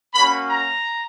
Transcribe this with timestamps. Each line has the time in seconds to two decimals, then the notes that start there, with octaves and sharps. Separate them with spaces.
0.14 A#3 C#4 F#4 B5
0.50 A#5